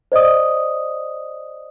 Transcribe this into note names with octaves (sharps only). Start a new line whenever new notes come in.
C5 D5 D#5 D#6